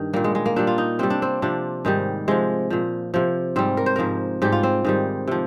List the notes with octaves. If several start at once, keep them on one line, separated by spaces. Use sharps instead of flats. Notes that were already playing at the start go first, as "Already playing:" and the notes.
Already playing: G2 D#3
A#2 G3 A#3
G#3
G#3
A#3
A#2 G3 D4
F4
D#4
C3 G3 C4
D4
C4
C3 F3 D4
G#2 D#3 G3
C3 F3 G#3
A#2 F3
C3 F3
G#2 G3 C4
A#4
C5
G#2 F3 A#4
G#2 G3 G4
F4
C4
G#2 D#3 G3
C3 F3